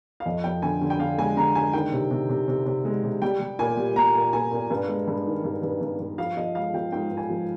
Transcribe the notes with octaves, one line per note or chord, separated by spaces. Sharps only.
F5
F2 D#5
F2 G5
D3 G#5
D3
G5
D3 F5
G#3 G#5
D3 A#5
G#3 G#5
D#3 G5
C3
C3
C3
C3
C3
G#3
C3
G3 G5
G3
A#2 G#5
G3
G3 A#5
A#2
A#2 G#5
A#2
G2
G#3
G2
D#3
G2
G2
G2
G2
F3 F5
F3 D#5
G#3 F5
F3 G5
G#2 G5
G#2
G#5
F3